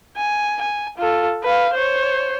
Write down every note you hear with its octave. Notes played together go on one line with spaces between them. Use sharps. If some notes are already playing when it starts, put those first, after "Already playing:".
G#5
G#5
F4 A4
B4 F5
C5 C#5